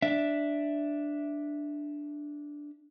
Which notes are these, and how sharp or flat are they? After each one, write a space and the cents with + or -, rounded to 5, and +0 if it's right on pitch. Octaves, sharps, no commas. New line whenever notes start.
D4 +0 E5 +0